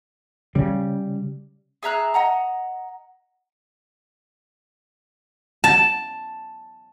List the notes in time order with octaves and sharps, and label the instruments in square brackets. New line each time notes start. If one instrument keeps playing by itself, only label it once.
[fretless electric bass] C#3 [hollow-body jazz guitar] G3
[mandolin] G#4 E5 A#5 F#6
D#5 F#5 A#5
[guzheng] A5